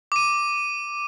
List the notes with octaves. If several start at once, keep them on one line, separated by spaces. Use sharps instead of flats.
D6 D#7